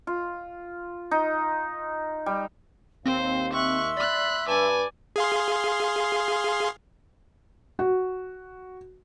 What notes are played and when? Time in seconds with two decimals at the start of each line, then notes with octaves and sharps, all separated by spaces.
0.07 F4
1.11 D#4
2.26 G3
3.05 D#2 C4 C5 F5
3.53 E5 C6 C#6 E6 F#6
3.97 D5 B5 F#6
4.48 G2 B4 D5 G#5 A5
5.16 G#4 F5 C6
7.79 F#4